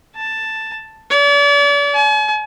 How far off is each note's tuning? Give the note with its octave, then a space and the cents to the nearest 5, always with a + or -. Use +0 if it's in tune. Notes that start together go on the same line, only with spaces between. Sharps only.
A5 +5
D5 -40
G#5 +45